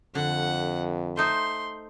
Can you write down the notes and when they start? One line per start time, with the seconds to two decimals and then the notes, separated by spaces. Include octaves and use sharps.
0.15 F2 D3 F#5
1.17 A3 D#4 C5 C6